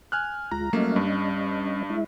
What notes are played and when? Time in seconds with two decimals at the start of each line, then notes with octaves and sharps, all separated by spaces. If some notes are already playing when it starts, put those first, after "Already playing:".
0.12 G#5 F6 F#6
0.51 D2 G#3 F4 A#5
0.73 F#3 G3 A3 A#3 C#4 D#5
0.96 G2
1.90 G#3 E4 E5